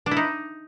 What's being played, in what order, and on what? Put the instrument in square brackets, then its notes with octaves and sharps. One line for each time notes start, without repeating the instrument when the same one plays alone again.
[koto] D4
E4
D#4